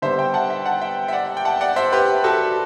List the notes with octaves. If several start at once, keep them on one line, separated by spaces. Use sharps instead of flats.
D3 G3 B3 C5 E5
E5 G5
F#5 A5
E5 G5
F#5 A5
E5 G5
E5
D5 F#5
G5
F#5 A5
D5 F#5
C5 E5
G4 B4
F#4 A4